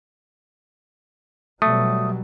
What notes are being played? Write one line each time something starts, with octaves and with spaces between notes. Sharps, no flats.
B2 F#3 G3 A3 D#6